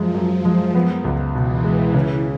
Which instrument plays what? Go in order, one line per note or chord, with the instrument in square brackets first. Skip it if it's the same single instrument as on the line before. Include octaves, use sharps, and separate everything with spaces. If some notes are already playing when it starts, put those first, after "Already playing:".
Already playing: [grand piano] F#2 G#3 [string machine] F3
[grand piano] F#2 [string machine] F3
[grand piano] G#3
B3
C#2
[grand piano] B2 [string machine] E3
[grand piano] G#3
[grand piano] C#3 [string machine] E3